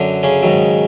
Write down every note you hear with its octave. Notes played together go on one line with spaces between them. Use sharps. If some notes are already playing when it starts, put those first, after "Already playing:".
Already playing: F#2 D3 F#3
C#3 C#4
G#2 D#3 F#3